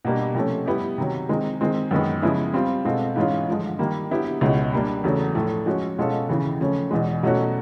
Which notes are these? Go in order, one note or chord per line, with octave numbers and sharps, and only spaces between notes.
B2 G3 A#3 D4 G4
C3 F3 A3 C#4
G3 B3 E4 G4
C3 D#3 F#3
D#3 G#3 C4
D#3 G#3 C4
F#2 D#3 G#3 B3
C#3 F3 G#3 B3 E4
G3 C4 F4
B2 G#3 C4 F4 A4
G#2 E3 G#3 C#4 F4
G2 D3 F3 G#3
D#3 G3 A#3
D3 F#3 B3 E4 G4
C#2 B2 G#3 C#4 E4
G3 A#3 D4
E2 C#3 F#3 A3
A2 F3 A3
F3 G#3 C#4 F#4
B2 G#3 C#4 F4 A4
D#2 C#3 E3
C#3 F3 A3 C#4
E2 B2 G#3
B2 F#3 A3 C#4 F#4